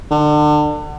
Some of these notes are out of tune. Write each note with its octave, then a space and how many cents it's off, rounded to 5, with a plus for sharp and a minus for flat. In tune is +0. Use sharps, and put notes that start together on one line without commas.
D3 +30